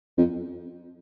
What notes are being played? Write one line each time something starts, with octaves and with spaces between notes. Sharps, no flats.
F2